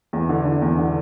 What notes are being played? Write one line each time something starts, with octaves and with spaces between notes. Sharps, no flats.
E2
D3
D3
E2
D3